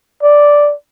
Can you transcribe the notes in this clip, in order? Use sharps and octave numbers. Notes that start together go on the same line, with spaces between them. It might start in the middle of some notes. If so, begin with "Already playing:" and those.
D5